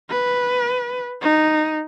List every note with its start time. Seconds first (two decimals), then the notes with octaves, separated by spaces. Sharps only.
0.10 B4
1.22 D#4